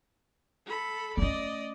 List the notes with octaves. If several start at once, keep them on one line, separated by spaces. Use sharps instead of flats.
A4 B5
A3 C#4 D5 D#5